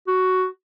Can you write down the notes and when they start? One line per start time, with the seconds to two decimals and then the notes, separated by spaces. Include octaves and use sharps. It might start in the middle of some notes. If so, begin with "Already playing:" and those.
0.07 F#4